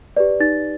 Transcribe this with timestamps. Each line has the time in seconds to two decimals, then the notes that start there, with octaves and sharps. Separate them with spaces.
0.17 G4 B4 D5
0.40 D#4 A6